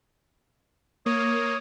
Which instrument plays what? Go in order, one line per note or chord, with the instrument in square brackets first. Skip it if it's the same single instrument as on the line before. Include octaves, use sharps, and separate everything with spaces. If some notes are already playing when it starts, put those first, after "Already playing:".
[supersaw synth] A#3 [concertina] C#5 D#6